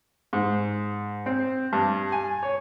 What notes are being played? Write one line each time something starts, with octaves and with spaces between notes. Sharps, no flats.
G#2
C4
G2
G#5
C#5